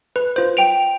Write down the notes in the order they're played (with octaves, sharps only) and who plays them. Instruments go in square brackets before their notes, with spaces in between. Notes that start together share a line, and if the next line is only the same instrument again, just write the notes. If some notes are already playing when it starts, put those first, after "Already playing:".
[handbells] B4
F4 C5
[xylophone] G5 D7 F7